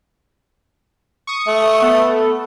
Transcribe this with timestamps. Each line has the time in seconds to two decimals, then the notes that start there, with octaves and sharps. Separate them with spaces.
1.27 C#6 D#6
1.47 A3
1.82 B3 A4